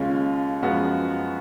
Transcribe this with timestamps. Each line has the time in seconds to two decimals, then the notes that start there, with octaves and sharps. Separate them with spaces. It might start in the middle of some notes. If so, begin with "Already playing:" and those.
Already playing: D#2 C#3 G#3 C#4 F4
0.63 F#2 F3 G#3 B3 F#4